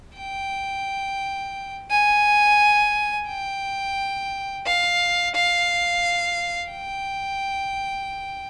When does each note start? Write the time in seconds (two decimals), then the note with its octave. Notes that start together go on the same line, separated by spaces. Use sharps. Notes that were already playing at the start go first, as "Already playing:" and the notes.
0.17 G5
1.91 G#5
3.28 G5
4.66 F5
5.35 F5
6.72 G5